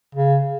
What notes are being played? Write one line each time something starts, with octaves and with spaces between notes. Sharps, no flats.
C#3